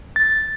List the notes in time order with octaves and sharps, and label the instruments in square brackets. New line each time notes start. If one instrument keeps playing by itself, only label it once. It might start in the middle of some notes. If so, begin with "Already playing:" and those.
[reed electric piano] A6